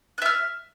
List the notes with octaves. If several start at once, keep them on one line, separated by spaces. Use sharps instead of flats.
E5 F6 F#6